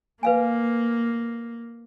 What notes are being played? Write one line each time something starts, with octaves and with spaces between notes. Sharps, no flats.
A#3 B4 F5 G#5